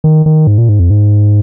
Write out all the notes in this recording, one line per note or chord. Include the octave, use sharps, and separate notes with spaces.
D#3
D#3
G#2
A#2
G#2
F2
G#2